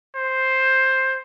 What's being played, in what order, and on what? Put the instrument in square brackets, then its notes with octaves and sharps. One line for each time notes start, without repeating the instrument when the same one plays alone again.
[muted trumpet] C5